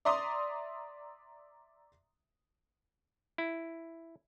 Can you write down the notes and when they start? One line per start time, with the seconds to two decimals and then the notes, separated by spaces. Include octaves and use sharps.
0.05 D5 E5 A#5 C6 D6 D#6
3.38 E4